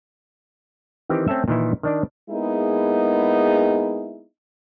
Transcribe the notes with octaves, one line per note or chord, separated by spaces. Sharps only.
D#3 E3 C4 G4
A3 C4 C#4 A4 E5
A#2 D#3 E3 E4
D#3 D4 D5
G#3 A#3 B3 D#4 E4 G#4